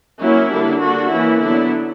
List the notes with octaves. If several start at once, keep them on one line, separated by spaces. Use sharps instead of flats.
F#3 A#3 C#4 E4
D3 G3 A#3 D4
D3 A#3 D4 F#4
E3 A#3 C#4 E4
D3 F#3 B3 D4 E4